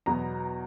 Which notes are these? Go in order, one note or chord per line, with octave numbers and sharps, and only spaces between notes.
E2 B2 F#3 B3 A#5